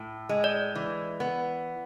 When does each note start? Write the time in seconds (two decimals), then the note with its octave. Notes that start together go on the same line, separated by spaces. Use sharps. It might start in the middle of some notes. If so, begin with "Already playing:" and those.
Already playing: A2
0.29 G#3
0.44 D5
0.75 E3
1.20 B3